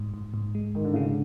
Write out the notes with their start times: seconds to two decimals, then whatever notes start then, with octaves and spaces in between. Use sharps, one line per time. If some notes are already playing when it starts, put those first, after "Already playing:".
Already playing: G#2
0.14 G#2
0.34 G#2
0.55 G#3
0.75 G#2 D#3
0.85 D3
0.94 C#3 G#3
1.03 D3